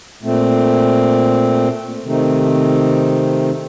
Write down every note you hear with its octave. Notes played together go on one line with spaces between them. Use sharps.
A#2 A3 C4
C3 D#3 A3 C4 D#4